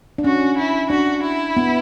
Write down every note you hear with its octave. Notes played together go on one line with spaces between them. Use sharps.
D4
C#4 F#4
E4
D4 F#4
E4
B3